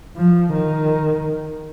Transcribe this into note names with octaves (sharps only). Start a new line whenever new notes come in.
F3
D#3